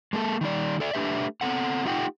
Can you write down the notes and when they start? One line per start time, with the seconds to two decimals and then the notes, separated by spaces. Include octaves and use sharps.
0.13 G#3 A#3 G#4 A4
0.41 D#3 G3 D5
0.80 A4 D5 E5
0.93 A3 D4 G4 B4 E5
1.41 B3 C4 A4 F#5
1.85 A3 D#4 F4 G4 F#5 G5